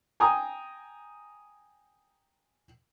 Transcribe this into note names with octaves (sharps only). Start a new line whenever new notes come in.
G5 G#5 A#5 D#6